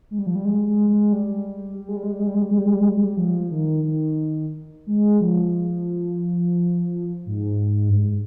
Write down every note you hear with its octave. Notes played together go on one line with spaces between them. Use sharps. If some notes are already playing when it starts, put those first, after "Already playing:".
G#3
G3
F3
G3
G#3
G#3
G#3
G3
G3
G#3
G3
G#3
G3
G#3
G3
G#3
G3
G#3
G3
G#3
G3
G#3
G3
G#3
G3
F3
D#3
D#3
G#3
F3
G#2
G2
G#2